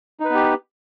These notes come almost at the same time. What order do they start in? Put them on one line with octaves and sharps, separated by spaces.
D#4 B4 B3 G4